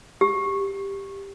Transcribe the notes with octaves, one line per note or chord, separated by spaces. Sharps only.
G4